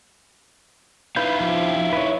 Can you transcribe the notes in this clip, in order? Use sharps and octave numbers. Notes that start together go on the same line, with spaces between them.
D#4 E4 B4 F5 B5 G6
F3 G4
B4 C#5